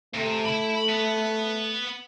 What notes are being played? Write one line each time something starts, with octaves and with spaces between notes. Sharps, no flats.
C3 A3
E4 B5
B3